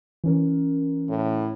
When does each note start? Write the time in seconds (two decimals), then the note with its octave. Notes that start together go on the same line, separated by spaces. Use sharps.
0.24 E3 C#4 A#4
1.09 A2